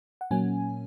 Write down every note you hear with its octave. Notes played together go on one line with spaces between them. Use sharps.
F#5
A#2 F#3 A#3 C#4 G#5